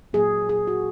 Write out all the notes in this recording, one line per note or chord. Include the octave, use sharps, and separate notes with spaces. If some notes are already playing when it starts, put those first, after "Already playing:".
A#2 F#3 A#3 G#4
G#4
F#4